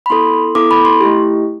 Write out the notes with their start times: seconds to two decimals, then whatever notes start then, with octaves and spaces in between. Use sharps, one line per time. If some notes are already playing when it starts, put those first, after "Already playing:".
0.06 B5
0.10 B3 E4 A4 C6
0.55 B3 E4 A4 D6
0.71 B5
0.85 C6
1.00 A3 E4 G4